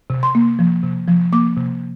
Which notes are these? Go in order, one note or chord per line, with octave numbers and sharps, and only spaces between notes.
C3
C6
A#3
F3
C3
F3
A#3 D6
C3